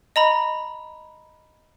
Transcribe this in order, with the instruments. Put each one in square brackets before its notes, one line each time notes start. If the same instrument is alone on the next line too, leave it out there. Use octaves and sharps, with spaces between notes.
[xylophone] D#5 A#5 B5